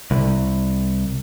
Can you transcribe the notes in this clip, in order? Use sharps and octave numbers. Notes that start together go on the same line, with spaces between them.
C2